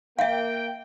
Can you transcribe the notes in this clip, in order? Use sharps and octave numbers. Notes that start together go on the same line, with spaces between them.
A#3 E5 F5 G5